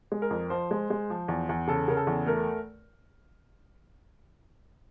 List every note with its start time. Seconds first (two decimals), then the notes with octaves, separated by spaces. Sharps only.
0.12 G#3
0.22 A#4
0.31 F2
0.50 F3 C5
0.71 G#3
0.90 G#3
1.10 F3
1.28 E2
1.49 E2
1.68 C#3 A4
1.88 C#3 A#4
1.97 A4
2.07 E2
2.26 A3 A#4